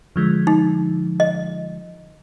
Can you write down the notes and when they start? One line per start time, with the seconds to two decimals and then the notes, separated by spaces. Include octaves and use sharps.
0.16 D3 F3 G#3
0.47 D#4
1.20 D#5